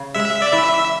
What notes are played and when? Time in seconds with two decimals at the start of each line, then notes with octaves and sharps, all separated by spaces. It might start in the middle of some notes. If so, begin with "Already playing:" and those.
Already playing: C#3
0.14 G#3 E5
0.42 D5
0.53 E3 E5